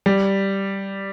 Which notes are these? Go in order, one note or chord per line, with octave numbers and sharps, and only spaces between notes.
G3